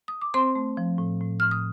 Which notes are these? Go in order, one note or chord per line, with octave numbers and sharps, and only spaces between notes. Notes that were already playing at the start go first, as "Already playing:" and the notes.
D#6
D6
C4 C5 C6
A3
F3
A2
A2
A2 F6
D#6